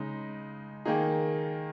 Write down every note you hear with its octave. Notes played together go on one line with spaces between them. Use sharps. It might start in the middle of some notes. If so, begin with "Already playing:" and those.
Already playing: C#3 G#3 D#4
D#3 A#3 D#4 G#4